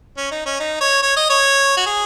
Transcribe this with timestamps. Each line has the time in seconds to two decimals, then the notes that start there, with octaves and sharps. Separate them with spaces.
0.17 C#4
0.31 D#4
0.46 C#4
0.60 D#4
0.81 C#5
1.02 C#5
1.16 D#5
1.30 C#5
1.77 F#4
1.86 G#4